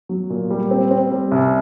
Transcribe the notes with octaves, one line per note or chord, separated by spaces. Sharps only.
F#3
A#2
G3
C4
C4
G3
C2